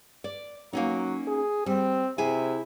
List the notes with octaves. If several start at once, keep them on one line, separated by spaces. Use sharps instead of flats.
D5
F#3 A#3 C#4 D#4
G#4
G3 C4
C3 E4 G#4 G#5